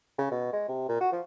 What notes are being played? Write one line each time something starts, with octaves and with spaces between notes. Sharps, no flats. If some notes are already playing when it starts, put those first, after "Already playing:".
C#3
B2
G#3
C3
A#2
F#4
F3